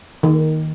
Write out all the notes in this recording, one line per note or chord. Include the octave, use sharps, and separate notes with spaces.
D#3